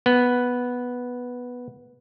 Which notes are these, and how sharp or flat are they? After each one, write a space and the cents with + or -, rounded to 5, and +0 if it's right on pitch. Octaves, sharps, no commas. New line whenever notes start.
B3 -5